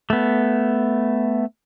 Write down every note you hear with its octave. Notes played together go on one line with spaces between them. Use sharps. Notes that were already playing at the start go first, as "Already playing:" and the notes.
A3 B3